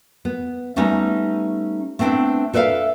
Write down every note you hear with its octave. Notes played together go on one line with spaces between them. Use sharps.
B3
G3 A3 B3 C#4 D#4
A3 B3 C4 D4 E4
A4 B4 D5 E5 F5